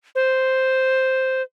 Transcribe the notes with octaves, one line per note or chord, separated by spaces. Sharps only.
C5